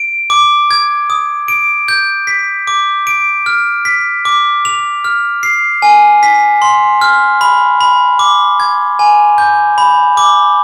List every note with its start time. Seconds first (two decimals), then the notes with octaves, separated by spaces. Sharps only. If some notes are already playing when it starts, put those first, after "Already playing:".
Already playing: D7
0.30 D6
0.71 G#6
1.10 D#6
1.48 D7
1.88 G6
2.27 B6
2.67 D6
3.07 D7
3.46 F6
3.85 B6
4.25 D6
4.65 F7
5.04 F6
5.43 C7
5.82 G#5
6.23 B6
6.62 C6
7.01 F6
7.41 B5
7.81 B5
8.19 D6
8.60 G#6
8.99 G#5
9.38 G6
9.78 B5
10.17 D6